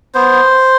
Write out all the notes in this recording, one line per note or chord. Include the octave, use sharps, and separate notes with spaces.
B3 C5